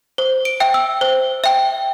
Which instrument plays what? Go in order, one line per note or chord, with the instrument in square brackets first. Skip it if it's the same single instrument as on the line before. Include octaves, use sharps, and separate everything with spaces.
[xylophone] C5
D7
E5 G5
E6
C5
E5 G5